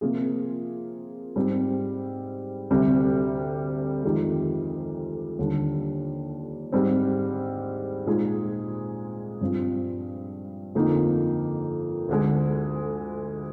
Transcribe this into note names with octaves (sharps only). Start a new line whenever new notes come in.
C3 F3 A#3 F4 G#4
G#2 G3 C4
D2 C3 G3
F2 D#3 G#3 D#4 G4
D#2 D3 G3 D4
G#2 G3 C4
A#2 G#3 D#4 G#4
G2 F3 C4
F2 D3 F3 A#3 D#4
D2 D3 G#3